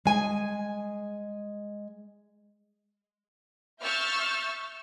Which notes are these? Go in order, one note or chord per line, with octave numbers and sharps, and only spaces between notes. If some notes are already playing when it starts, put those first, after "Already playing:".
G#3 G#5
E5 C#6 E6 F6 G6 A6